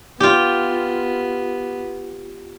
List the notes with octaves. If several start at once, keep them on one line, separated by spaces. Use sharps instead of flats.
B3 F4 G4